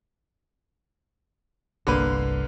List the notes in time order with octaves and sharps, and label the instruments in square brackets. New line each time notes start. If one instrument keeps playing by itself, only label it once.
[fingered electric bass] G1 C2 [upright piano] D3 A#3 B4